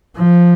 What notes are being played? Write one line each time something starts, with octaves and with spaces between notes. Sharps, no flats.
F3